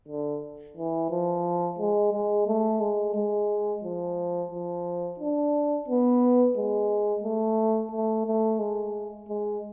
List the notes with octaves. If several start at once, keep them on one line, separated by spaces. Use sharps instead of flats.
D3
E3
F3
G#3
G#3
A3
G#3
G#3
F3
F3
D4
B3
G#3
A3
A3
A3
G#3
G#3